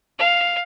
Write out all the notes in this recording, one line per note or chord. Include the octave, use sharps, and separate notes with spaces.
F5